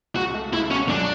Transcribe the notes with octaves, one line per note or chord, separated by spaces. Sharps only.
C#2 F#4
A3
C#2 E4
B2 C#4
F#2 D4